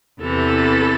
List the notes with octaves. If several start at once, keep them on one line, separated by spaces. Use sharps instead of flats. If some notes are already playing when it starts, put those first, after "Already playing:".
E2 C3 E3 A4